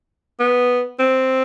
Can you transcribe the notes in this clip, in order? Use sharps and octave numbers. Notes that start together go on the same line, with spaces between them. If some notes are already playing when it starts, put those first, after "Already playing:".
B3
C4